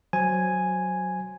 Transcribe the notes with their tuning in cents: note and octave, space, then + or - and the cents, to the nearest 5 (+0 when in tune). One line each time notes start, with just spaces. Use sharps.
F#3 +0 C5 +0 G#5 +0